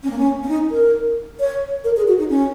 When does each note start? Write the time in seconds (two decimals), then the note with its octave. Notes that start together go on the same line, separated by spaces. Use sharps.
0.03 C#4
0.10 A#3
0.18 C#4
0.43 C#4
0.48 D#4
0.71 A#4
1.40 C#5
1.84 A#4
1.97 G#4
2.08 F#4
2.18 D#4
2.30 C#4